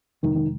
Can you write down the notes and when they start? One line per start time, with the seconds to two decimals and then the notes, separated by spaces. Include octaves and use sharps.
0.23 F2 C3 D#3 F3 G#3
0.36 D#3